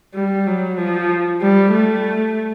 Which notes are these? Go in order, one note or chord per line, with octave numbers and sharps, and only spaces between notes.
G3
F#3
F3
G3
A3